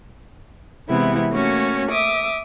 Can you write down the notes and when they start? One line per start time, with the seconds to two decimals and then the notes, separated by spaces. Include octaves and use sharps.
0.89 C3 E3 G#3 B3 C4 E4
1.31 A3 A#3 C#4 F#4 C#5
1.91 E5 D6 D#6